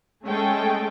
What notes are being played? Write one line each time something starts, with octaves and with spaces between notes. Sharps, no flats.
G#3 A3 C#4 G#4 A4 G5